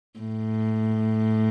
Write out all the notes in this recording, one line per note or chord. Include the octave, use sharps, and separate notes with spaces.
A2